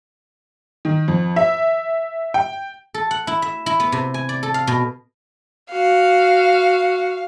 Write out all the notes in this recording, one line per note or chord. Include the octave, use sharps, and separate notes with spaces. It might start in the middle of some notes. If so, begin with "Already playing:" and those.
D#3
F2
E5
G5
A4
F#5
E4
E5
E4
B3
C3
G#5
D5
A4
F5
B2
F#4 F5